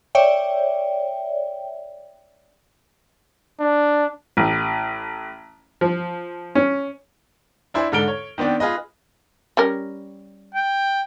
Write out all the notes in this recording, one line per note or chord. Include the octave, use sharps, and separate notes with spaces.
C#5 D5 E5 G5
D4
A1
F3
C#4
D4 E4 C5 G#5
G#2 D3 A4 F6 D7 G7
C#5
D#3 B3 C4 D4
F4 G#4 B4 D#5
G3 C#4 A#4
G5